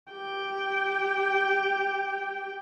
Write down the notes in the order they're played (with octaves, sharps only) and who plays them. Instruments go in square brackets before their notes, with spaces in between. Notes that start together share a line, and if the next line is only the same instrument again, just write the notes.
[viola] G4 G5